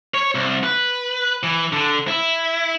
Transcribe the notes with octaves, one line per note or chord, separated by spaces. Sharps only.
C#5
C2
B4
E3
D3
E4